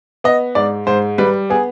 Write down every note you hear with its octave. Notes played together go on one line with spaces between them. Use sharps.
B3 D#5
G#2 D5
G#2 C5
G3 B4
B3 G#4